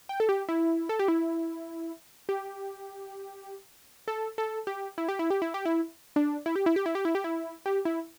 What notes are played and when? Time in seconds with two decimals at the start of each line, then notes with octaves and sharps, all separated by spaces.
0.09 G5
0.20 A4
0.29 G4
0.49 E4
0.89 A4
0.99 G4
1.08 E4
2.29 G4
4.08 A4
4.38 A4
4.67 G4
4.98 E4
5.09 G4
5.19 E4
5.30 G4
5.42 E4
5.54 G4
5.66 E4
6.16 D4
6.46 E4
6.56 G4
6.66 E4
6.76 G4
6.86 E4
6.95 G4
7.05 E4
7.15 G4
7.24 E4
7.66 G4
7.85 E4